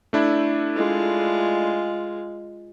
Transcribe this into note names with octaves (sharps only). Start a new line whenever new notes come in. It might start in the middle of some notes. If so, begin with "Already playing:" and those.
A3 D4 E4
G#3 F4